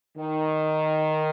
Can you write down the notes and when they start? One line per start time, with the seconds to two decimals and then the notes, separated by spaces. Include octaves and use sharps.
0.17 D#3